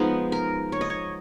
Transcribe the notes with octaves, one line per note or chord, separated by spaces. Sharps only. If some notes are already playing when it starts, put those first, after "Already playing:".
Already playing: F3 G#3 B3 D#4
A#4
C#5
D#5
C#5